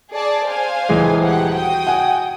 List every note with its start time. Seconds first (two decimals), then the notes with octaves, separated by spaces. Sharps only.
0.11 G#4 D5 A5
0.47 C5 F5 G#5
0.89 D#1 E3 G#3
1.22 G4 F#5
1.54 F#4 G5 D#6
1.87 F#5 G#5